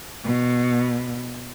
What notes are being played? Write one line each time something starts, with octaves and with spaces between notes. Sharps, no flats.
B2